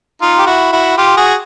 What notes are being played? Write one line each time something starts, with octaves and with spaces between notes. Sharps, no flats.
D#4 F4
G4
E4 F#4
E4 F#4
F4 G4
F#4 G#4